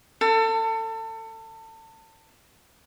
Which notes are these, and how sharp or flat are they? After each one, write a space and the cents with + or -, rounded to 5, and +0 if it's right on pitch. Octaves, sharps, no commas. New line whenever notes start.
A4 +30